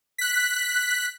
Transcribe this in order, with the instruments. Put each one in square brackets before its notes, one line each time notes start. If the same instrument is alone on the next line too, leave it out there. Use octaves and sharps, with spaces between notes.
[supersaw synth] F#6 B6